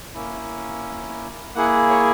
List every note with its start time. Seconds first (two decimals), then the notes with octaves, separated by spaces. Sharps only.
0.15 A#3 C#4 E4
1.55 A#3 E4 G#4 F#5
1.90 C#5